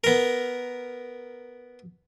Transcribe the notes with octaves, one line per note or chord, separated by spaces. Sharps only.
B3 A#4